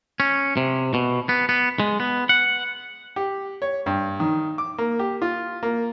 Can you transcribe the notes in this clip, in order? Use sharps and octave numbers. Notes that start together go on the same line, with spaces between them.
C#4
C3
B2
B3
B3
G#3
B3
F#5
G4
C#5
G2
D#3
D6
A#3
G4
F4
A#3